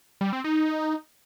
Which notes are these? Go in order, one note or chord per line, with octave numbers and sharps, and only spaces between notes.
G3
C4
D#4